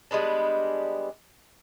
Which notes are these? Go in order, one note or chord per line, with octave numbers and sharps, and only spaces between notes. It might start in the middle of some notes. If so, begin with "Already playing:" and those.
G3 G#3 B3 D4